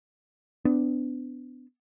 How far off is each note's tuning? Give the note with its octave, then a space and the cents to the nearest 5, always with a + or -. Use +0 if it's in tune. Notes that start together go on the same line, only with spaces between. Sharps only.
B3 +35 D4 +0